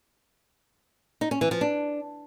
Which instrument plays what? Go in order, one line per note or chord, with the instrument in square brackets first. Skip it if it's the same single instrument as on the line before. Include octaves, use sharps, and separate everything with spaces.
[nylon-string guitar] D#4
C#4
E3
F3
D4